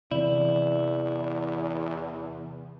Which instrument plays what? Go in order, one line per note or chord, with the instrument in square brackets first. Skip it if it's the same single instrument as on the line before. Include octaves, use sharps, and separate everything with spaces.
[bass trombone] E2 [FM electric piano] C3 E3 [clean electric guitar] E4 [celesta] D5